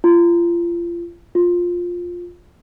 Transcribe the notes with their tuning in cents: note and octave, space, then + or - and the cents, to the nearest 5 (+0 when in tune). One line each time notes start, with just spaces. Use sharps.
F4 -30
F4 +10